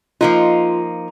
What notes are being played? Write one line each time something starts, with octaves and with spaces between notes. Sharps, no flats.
F3 A#3 D#4 F4